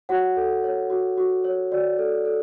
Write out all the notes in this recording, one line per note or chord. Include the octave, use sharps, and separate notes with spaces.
F#4 C#5 F#5
A4
C#5
F#4
F#4
C#5
F#4 D5
A4
A4